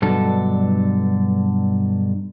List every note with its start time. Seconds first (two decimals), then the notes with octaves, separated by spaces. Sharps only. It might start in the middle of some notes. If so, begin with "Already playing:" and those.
0.02 G2 B2 D3 F#3 A4